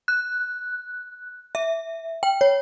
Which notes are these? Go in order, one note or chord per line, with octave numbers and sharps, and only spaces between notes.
F#6
E5
G5
C#5